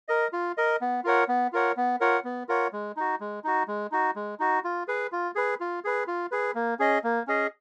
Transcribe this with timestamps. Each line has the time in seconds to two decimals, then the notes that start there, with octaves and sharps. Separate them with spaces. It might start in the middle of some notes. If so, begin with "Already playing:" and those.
0.08 A#4 D#5
0.33 F4
0.57 A#4 D#5
0.81 B3
1.04 F4 A#4 C#5 F#5
1.28 B3
1.53 F4 A#4 C#5 F#5
1.77 B3
2.00 F4 A#4 C#5 F#5
2.24 B3
2.49 F4 A#4 C#5 F#5
2.73 G#3
2.97 D#4 F#4
3.20 G#3
3.44 D#4 F#4
3.68 G#3
3.92 D#4 F#4
4.16 G#3
4.39 D#4 F#4
4.64 F4
4.88 G#4 B4
5.12 F4
5.35 G#4 B4
5.60 F4
5.84 G#4 B4
6.07 F4
6.32 G#4 B4
6.55 A#3
6.79 C#4 G#4 D#5
7.04 A#3
7.27 C#4 G#4 D#5